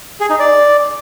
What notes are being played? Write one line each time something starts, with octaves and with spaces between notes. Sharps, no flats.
G#4
D#4
D5